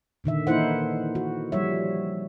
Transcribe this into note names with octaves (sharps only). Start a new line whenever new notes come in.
A#2 D3 D#3 E5
E3 A#3 D#4 E4 C5 F#5
F#4
F3 G3 C#5 E5